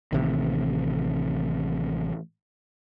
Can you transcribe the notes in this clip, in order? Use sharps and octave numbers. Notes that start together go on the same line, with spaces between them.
A1 C3 D#3